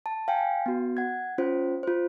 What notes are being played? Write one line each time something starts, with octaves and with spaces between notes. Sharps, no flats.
A5
F5 G5 G#5
B3 F#4
F#5 G#6
C#4 F4 C5
F4 C5